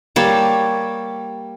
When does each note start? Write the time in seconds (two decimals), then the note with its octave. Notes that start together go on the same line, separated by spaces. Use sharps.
0.16 G3 A#3 C#5 A5